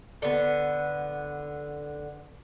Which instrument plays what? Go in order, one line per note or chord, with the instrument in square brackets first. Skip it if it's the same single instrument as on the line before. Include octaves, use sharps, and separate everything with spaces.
[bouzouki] D3 B3